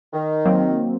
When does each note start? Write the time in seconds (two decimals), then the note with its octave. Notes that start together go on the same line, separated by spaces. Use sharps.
0.13 D#3
0.45 F#3 A#3 C4